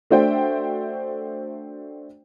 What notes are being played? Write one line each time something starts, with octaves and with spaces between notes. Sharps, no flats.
A3 D4 F#4 C5 E5 G5